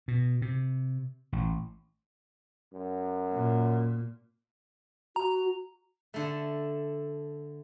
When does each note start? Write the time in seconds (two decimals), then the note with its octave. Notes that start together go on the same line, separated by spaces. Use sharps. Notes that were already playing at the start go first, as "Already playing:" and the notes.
0.08 B2
0.42 C3
1.32 A1
2.73 F#2
3.33 A#2
5.16 F#4 A#5
6.14 D3 A3